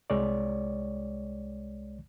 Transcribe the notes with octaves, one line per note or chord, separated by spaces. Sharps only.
C2 G#3 C#5 D5